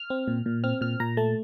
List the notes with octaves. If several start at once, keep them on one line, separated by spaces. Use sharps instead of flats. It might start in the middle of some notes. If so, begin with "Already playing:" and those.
Already playing: F6
C4
A#2
A#2
C4 F6
A#2 F6
A#2 A#5
A3 A5